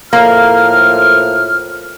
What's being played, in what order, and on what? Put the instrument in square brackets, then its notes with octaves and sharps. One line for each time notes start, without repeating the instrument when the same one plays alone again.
[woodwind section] A2 F3 F6 [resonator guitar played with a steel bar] A#3